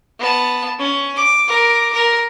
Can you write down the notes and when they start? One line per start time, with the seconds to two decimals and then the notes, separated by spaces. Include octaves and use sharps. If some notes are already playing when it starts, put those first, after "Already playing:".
0.19 B3 A5
0.79 C#4
1.16 D6
1.48 A#4 D6
1.93 A#4